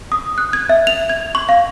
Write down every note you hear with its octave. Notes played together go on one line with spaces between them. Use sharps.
D#6
F#6
G#6
E5
F7
G#6
C#6
F5